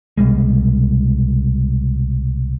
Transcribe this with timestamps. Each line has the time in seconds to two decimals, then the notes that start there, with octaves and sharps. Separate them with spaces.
0.18 C2 B2 G3 G#3